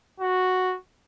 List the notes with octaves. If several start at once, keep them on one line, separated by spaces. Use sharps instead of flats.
F#4